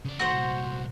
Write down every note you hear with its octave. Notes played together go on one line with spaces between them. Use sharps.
C#3 D5
D#3 A3 F#4 C5 F#5
C2 A#2